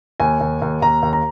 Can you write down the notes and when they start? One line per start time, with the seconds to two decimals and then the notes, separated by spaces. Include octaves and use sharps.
0.20 D#2 G#5
0.41 D#2
0.62 D#2
0.82 D#2 A#5
1.03 D#2
1.13 A#5